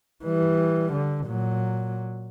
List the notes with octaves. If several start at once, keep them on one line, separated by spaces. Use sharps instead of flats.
E3 G3
D3
A#2 F#3